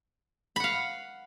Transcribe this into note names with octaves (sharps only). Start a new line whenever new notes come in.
F5 F#5 B5